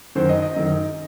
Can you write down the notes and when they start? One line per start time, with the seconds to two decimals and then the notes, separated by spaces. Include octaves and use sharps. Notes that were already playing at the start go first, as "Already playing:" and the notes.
0.15 F#2 D#3 C5
0.29 D#5
0.42 D#5
0.56 F#2 D#3